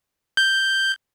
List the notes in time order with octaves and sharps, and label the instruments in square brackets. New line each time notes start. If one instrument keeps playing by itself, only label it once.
[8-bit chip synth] G6